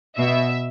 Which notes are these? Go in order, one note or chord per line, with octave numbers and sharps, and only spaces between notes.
B2 E5